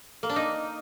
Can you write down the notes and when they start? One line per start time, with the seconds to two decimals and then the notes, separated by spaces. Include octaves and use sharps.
0.23 A#3
0.29 D4
0.36 D#4